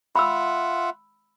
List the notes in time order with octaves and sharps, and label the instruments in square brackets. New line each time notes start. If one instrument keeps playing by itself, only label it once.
[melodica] F4 E5 F#5 [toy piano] B5 E6